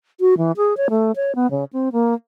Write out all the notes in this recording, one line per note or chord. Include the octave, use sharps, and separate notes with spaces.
F#4
E3
G#4
C#5
A3
C#5
B3
C#3
C4
A#3